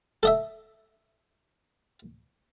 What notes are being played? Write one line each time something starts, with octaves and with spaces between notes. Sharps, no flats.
A4 D#5 E5